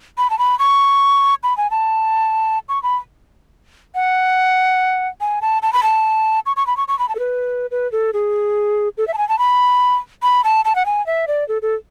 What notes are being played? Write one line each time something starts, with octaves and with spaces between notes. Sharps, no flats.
B5
A5
B5
C#6
B5
G#5
A5
C#6
B5
F#5
G#5
A5
A5
B5
A5
C#6
C#6
B5
C#6
C#6
B5
A5
A4
B4
B4
A4
G#4
A4
E5
A5
G#5
A5
B5
B5
A5
A5
F#5
G#5
E5
D5
A4
A4